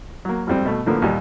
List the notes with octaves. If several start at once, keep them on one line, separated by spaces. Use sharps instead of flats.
F#3 A#3
G#1 F2 G3 C4
B2 A3
A2 D3 F3 A#3 B3
D#2 A#2 G3